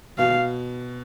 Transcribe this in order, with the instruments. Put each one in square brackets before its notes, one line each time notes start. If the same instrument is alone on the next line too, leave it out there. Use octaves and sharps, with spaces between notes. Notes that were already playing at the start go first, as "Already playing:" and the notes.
[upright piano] B2 [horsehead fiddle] F5